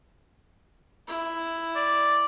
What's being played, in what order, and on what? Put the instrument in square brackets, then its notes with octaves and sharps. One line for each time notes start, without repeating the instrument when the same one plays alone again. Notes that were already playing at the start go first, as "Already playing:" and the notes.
[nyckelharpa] E4
[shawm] D5